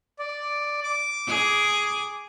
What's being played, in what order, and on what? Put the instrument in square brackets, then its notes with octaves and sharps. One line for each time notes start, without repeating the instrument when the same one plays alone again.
[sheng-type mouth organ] D5
D6
[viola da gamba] G#4